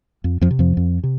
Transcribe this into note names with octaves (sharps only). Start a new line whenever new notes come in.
F2
F2 F3
C3
F2 F3
F2
C3